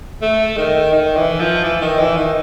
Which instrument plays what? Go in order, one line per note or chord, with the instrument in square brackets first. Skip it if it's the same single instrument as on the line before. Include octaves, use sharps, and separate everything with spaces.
[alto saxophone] A3
D#3
D#3
E3
F3
E3
D#3
E3
D#3